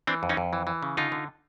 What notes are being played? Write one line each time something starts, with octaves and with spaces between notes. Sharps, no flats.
E3 C4 D4
F2
C#4 D#4
F2
E3
E3
C#3
D3 D#4 F4
D3